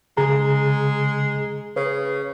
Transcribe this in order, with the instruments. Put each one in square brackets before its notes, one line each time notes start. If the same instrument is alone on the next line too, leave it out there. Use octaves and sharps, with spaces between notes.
[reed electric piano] C#3 G#4 A#5 [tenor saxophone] G#3
[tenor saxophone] C#3 [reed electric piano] B4